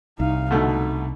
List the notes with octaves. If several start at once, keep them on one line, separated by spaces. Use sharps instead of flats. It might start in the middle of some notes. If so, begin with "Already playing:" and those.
C2 D#4 F5
B2 D3 A3 D#4